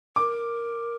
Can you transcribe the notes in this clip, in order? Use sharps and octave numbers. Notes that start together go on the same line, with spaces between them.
A#4 D6